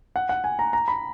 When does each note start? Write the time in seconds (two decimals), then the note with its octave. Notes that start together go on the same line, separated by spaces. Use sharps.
0.16 F#5
0.29 F#5
0.44 G#5
0.59 A#5
0.73 A#5
0.88 B5